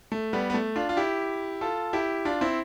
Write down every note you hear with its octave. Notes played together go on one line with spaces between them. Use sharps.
A3
G3 B3
B3
A3
D4 F4
F4
E4 G4
F4 A4
E4 G4
D4 F4
C4 E4